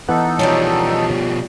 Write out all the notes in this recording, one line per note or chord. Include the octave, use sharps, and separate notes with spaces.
E3 B3 D#4 A4 F#5
B2 F3 C#4 G4 D5